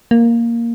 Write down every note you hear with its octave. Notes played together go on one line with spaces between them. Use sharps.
A#3